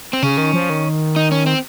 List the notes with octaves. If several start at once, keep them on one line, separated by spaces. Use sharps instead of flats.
C4
C#3 C#4
D#3
F3
D#3
D#4
C#4
C4